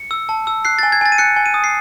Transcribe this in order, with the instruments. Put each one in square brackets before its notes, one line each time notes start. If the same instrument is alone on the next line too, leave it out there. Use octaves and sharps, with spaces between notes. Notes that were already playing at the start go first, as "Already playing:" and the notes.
Already playing: [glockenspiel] C#7
E6
A5
E6
F#6 C7
A6
G#5
G#6
G#5 A6
D#7
F#6 C#7
G#5
D#7
D#6
C7